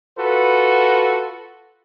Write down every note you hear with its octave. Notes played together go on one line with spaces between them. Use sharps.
F4 F#4 A4 B4